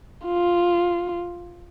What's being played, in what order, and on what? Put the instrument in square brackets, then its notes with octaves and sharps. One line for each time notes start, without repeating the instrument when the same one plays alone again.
[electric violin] F4